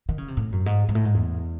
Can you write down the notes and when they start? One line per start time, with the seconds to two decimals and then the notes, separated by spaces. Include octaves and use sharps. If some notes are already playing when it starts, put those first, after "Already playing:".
0.09 D#3
0.18 C#3
0.28 C3
0.37 A2
0.52 F#2
0.66 G#2
0.89 G#2
0.95 A2
1.05 G#2
1.14 E2